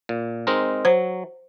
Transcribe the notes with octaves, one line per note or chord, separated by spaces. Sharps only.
A#2
G#3 C4 D#4 A#4
F#3 C5